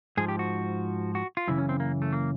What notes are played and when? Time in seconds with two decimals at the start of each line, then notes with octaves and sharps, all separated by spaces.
0.17 G#2 F3 G#4
0.28 G4
0.39 F#4
1.15 F#4
1.37 F4
1.47 F#2 C#3 E3 E4
1.58 C#4
1.69 C4
1.80 A#3
2.02 A3
2.13 A#3